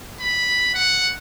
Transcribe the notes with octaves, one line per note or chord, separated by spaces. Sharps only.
B5
F#5